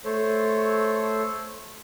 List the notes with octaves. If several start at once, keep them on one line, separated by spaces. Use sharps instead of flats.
A3 A4 C5 C#5